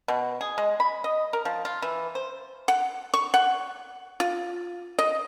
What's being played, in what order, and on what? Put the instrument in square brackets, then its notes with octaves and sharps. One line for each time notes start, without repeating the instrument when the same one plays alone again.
[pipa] B2
G#4
G#3
B5
D#5
A#4
F3
F4
E3
C5
F#5
C#6
F#5
F4
D#5